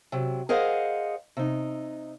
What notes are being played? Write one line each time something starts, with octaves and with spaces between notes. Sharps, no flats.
C3 F#3
G#4 A#4 C5 D#5 F5 F#5
C3 D#4